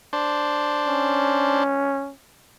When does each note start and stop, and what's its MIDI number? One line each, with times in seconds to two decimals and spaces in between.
0.13 1.64 62
0.13 1.64 72
0.87 2.12 61